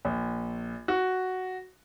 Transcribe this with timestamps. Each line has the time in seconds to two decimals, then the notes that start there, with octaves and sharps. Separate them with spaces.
0.05 A#1
0.88 F#4